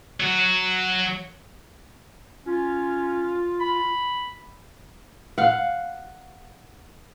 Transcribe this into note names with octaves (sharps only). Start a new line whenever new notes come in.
F#3 F#4
C#4 F4
B5
F5 F#5